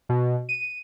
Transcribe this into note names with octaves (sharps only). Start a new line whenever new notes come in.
B2
D#7